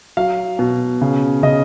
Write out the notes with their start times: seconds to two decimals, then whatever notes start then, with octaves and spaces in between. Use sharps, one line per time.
0.17 F#3 F5
0.59 B2
1.01 C#3
1.43 C#3 D#5